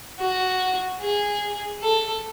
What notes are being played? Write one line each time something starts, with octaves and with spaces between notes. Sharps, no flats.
F#4
G#4
A4